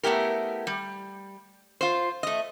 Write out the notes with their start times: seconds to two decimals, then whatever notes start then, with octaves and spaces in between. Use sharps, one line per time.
0.03 A3 B3 E4 G4 A#4
0.67 G3
1.81 F4 C5
2.23 A3 D#5